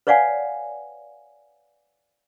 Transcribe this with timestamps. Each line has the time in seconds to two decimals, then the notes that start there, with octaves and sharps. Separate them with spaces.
0.07 B4 C#5 D5 F5 F#5 G#5